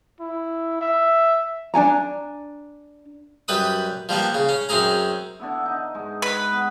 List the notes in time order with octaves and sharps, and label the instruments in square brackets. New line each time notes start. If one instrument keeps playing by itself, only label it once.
[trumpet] E4
E5
[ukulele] D4 D#4 G#5 A#5
[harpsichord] F#2 G3 B4 B5 D#6
F3 G3 A#3 B3
C#3
C#4
F#2 C4 C#4 G#4 A#5
[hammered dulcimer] D3 B3 E4
D#4
G#2 G#3
[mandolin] B4
[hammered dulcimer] B3